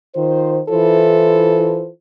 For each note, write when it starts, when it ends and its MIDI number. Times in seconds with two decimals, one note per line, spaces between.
0.15 0.59 51
0.15 0.59 65
0.15 0.59 72
0.70 1.88 52
0.70 1.88 64
0.70 1.88 65
0.70 1.88 69
0.70 1.88 72